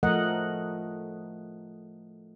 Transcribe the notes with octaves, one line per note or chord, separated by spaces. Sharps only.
F3 A3 A#4 D#5 F#5